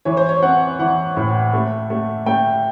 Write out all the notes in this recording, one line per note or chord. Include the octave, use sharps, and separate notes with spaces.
E3 C#5
C5
C#5
C4 F#5
E3 F#5
A2
A3
A3
A3 G5